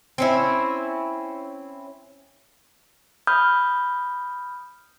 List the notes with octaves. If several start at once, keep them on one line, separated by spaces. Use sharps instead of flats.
C4 C#4 E4
B5 D#6 F6 G6